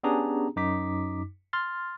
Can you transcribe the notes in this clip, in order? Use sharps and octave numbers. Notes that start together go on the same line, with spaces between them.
B3 C#4 D4 G4 G#4 A#5
F#2 D#4 D6 B6
C6 F6 A6